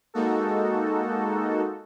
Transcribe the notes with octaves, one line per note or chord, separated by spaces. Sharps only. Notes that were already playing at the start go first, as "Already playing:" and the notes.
G#3 A#3 D#4 F#4 A4